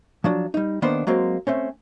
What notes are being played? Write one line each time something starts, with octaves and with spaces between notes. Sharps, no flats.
F3 F#3 D4
G3 D#4
D#3 A#3 B3 D4 C5 B5
F#3 G#3 A#3 C4
A3 C4 C#4